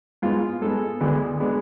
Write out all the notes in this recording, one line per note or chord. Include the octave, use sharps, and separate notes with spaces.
G#2 G#3 B3 F4
G#2 G#3 B3 A4
D2 D3 G#3 B3
D3 G#3 B3